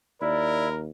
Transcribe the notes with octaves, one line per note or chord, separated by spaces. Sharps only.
D#2 E4 A#4 D5